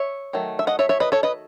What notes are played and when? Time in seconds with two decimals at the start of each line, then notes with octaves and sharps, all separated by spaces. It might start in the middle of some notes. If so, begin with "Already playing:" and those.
Already playing: C#5 E5
0.33 D#3 F#3 A3
0.59 E5
0.67 D#5 F#5
0.79 C#5 E5
0.89 C#5 E5
1.00 B4 D#5
1.12 A4 C#5
1.23 B4 D#5